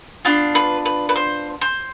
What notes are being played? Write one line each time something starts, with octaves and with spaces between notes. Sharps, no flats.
B3 D4 F4
B4
B4
B4
C5
C5